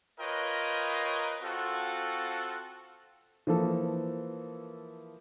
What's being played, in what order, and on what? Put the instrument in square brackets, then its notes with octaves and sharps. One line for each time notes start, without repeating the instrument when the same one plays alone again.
[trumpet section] F4 A#4 B4 C#5 D#5 G5
C4 F4 F#4 A4
[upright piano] E3 F3 A#3 A4